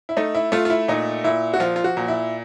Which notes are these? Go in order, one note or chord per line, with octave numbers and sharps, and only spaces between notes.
E4
A3 D#4
E4
A3 F4
F4
E4
A#2 D#4
A#2 E4
F#4
F3 F4
F4
F#4
A#2
E4